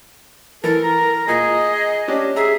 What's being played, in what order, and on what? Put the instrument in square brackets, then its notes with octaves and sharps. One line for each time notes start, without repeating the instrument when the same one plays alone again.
[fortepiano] E3 [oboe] A4 [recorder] A#4
[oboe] A#5
[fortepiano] A#2 [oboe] G#4 [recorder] D#5
[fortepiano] C#4 D4 G4
[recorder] G#4 [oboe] E5 [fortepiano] A#5